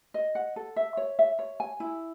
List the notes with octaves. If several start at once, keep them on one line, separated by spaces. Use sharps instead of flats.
D#5
F#5
A4
E5
C#5
E5
C#5
G#5
E4